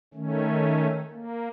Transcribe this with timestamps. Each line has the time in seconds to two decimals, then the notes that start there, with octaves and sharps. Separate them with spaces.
0.14 D#3 A3 C#4
1.11 A#3